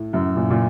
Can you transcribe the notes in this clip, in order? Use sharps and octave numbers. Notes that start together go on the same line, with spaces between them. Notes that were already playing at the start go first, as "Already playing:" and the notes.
Already playing: A2
F#2
A#2
A#2